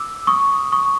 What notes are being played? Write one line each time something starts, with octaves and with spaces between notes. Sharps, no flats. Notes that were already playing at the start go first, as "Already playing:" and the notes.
Already playing: D6 E6
C#6 D#6
C#6 D#6